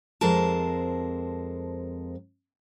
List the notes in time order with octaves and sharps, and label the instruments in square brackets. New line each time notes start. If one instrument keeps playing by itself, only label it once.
[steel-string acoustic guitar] F2 G#3 C4 A#4 A5